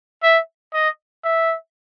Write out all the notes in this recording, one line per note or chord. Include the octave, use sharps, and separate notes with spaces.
E5
D#5
E5